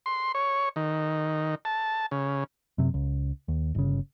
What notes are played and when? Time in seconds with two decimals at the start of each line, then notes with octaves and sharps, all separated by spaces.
0.06 C6
0.35 C#5
0.76 D#3
1.65 A5
2.11 C#3
2.78 F#2 C3
2.94 C#2
3.48 D#2
3.75 G1 C#3